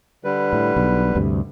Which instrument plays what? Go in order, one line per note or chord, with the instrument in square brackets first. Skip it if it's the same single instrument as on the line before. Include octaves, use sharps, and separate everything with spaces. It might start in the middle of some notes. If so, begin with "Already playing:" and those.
[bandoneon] D3 G3 B4
[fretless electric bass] A2
B1
D2 G2 C3